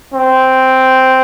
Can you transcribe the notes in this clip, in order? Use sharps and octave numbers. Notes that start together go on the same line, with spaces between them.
C4